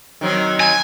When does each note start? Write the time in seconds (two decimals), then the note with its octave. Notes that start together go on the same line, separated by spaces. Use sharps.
0.21 D#3 F#3 C4
0.60 G#5